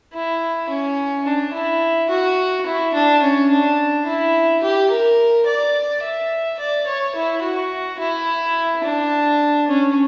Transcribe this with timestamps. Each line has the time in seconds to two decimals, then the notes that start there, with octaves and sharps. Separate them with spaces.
0.13 E4
0.69 C#4
1.26 D4
1.53 E4
2.09 F#4
2.66 E4
2.94 D4
3.22 C#4
3.50 D4
4.06 E4
4.62 G4
4.90 A#4
5.46 D5
6.02 E5
6.59 D5
6.87 C#5
7.15 E4
7.43 F#4
7.99 E4
8.83 D4
9.68 C#4